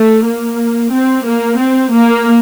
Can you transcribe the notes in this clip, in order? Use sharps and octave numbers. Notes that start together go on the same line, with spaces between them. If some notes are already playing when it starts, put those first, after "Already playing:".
Already playing: A3
A#3
C4
A#3
C4
A#3